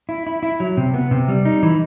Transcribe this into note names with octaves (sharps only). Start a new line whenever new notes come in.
E4
E4
E4
F#3
C3
B3
C3
G3
D#4
E3